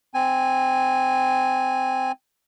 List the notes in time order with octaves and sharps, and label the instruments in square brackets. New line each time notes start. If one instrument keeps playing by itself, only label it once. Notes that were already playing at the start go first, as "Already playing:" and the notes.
[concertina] C4 G#5